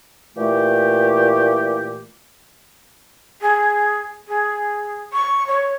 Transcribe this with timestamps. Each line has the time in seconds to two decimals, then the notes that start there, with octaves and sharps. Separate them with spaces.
0.36 A#2 E3 A3 G4
3.41 G#4
4.28 G#4
5.13 C#6
5.47 C#5